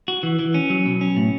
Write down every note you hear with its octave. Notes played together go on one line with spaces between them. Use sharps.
F#4
E3
E3
C#4
F#3
B2
C#4
A2